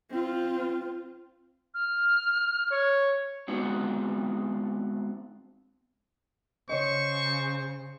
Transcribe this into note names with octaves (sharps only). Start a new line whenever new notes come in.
C4 F4
F6
C#5
G#3 B3 C4 D4 D#4 F#4
C#3 C5 C#5 D#5 C#6